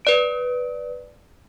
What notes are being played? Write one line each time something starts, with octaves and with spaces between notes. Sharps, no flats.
B4 D5 D7